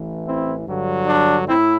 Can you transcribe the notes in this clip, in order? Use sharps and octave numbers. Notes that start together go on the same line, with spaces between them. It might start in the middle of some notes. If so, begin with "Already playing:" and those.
Already playing: A1 A2 E3
C4 E4
G2 D3 F#3
D4
A2 C4 E4